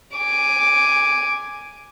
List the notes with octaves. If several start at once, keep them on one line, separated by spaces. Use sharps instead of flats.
G#5 D6